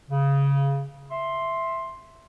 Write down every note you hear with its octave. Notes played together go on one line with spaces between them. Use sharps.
C#3
E5 C6